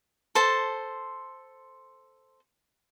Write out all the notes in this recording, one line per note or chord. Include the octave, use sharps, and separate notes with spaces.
A4 C5 A5